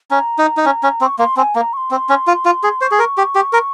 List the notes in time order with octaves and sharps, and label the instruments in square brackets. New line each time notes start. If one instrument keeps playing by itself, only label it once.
[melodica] C#4 [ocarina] A#5
[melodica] D#4
D#4
C#4
C#4
C4
[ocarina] C#6
[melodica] A#3 [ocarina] C6
[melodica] C4 [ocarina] G#5
[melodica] A#3 [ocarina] A#5
[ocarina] C#6
C6
[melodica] C4
C#4
F4
F4
G#4
[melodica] C5 [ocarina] C#6
[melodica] G#4
A#4
G4
G4
A#4